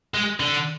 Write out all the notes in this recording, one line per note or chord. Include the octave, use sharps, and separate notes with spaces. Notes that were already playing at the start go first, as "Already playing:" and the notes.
G#3
D3